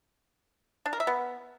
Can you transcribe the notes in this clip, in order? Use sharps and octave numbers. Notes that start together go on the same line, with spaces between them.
D4
A#4
E5
B3